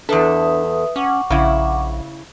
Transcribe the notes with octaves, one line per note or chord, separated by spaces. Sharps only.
E2 D4 A4 B4 E5 D#6
C#4 F#5 C#6 D6
A#1 C#3 E4